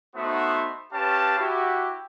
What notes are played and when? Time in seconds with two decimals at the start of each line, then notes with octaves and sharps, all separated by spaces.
0.16 A3 B3 D#4 F#4 C5 E5
0.93 C#4 G4 B4 F5 A5
1.39 E4 F#4 G4